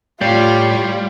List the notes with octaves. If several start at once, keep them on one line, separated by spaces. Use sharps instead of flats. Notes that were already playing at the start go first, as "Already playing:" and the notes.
A2 G3 F4 C#5 D5 F5 G5